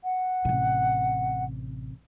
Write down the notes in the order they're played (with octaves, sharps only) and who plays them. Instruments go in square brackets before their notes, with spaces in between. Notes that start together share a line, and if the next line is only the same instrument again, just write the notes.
[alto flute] F#5
[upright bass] A1 C3